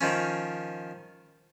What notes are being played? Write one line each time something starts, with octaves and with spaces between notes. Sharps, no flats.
D#3 F3 C#4